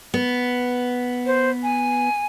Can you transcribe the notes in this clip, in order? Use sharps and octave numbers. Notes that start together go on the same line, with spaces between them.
B3
C5
G#5